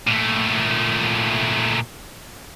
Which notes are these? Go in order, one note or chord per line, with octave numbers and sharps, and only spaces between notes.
A#2 A3